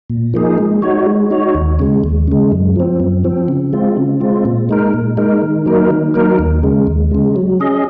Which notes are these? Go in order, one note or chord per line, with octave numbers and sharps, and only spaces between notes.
A#2
F3 A#3 D#4 G#4
G#3
D#4 F#4 C#5
G#3
D#4 F#4 C#5
D#2
C#3 G#3
D#2
C#3 G#3
F#2
F3 C4
F#2
F3 C4
C#3
G#3 C4 F4
C#3
G#3 C4 F4
A#2
G#3 D#4 A#4
A#2
G#3 D#4 A#4
D#3
F#3 A#3 D#4 A#4
D#3
F#3 A#3 D#4 A#4
D#2
C#3 G#3
D#2
C#3 G#3
F#3
C#4 G#4 D#5